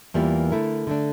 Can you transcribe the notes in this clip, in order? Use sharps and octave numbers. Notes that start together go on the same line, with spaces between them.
E2 E3 G3 A#3 F4
D3 A3 E4 A#4
D3 A3 D4